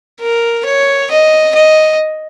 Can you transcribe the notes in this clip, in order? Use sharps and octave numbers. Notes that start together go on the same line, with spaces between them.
A#4
C#5
D#5
D#5